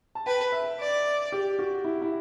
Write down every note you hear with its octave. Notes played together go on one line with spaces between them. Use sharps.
A5
B4 G5
E5
D5
G4
F#4
E4
E4